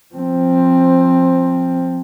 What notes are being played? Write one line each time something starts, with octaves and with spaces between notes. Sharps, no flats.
F3 C4